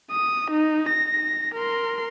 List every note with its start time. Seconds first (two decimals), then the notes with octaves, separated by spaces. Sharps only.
0.11 D#6
0.51 D#4
0.89 A#6
1.54 A#4 C6